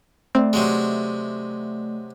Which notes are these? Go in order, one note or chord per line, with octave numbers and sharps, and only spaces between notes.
A3 C4 D5
C3 F#3 G#3